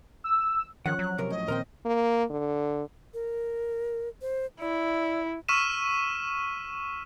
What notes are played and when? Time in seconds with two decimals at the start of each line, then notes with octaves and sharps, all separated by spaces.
0.24 E6
0.86 D#3 F3 C#4 C#5 F#5 F#6
0.99 F#3
1.18 C3 A#4
1.30 A2 D#5
1.48 A#2 D#3 C4 A#4 C5 G5
1.85 A#3
2.30 D3
3.14 A#4
4.22 C5
4.61 E4 D5
5.49 C#6 E6 F6 B6 D#7 E7